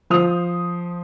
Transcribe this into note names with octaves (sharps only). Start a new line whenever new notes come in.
F3 C5 D#6 F7